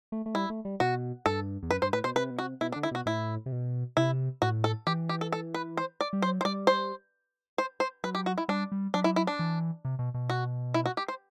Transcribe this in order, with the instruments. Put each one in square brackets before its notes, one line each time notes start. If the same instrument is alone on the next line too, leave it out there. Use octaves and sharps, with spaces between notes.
[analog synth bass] A3
A3
[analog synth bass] G3 [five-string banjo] E4
[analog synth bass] A3
G3
[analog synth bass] B2 [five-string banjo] F#4
[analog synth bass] G2 [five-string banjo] A4
[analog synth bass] E2
[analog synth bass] F#2 [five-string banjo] B4
[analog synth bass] G2 [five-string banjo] C5
[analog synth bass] A2 [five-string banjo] B4
[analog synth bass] B2 [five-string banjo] C5
[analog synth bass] C3 [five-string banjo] B4
[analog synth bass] B2
[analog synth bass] C3 [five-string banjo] F#4
[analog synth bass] B2 [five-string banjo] E4
[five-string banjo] D4
[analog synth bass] D3
[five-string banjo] E4
[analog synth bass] B2 [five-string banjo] F#4
[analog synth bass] A2 [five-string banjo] E4
[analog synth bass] C3
B2
[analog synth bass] C3 [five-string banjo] E4
[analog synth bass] A2 [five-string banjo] F#4
[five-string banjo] A4
[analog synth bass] E3 [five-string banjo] G4
[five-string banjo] G4
A4
A4
B4
C5
D5
[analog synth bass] G3
[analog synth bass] F#3 [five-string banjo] C5
[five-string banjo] C5
[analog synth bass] G3 [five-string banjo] D5
[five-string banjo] C5
C5
C5
[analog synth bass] F#3 [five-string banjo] B4
[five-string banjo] G4
F#4
E4
[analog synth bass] G3 [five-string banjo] D4
[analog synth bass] G3
[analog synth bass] F#3 [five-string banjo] D4
[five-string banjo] E4
E4
D4
[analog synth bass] E3
C3
B2
B2
[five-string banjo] F#4
E4
F#4
G4
C5